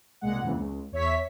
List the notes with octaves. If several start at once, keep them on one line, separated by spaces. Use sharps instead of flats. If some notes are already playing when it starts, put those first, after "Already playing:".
C2 A#2 G#3 F#5
F2 C#3 E3 A#3
C#2
E2 C#5 E5 B6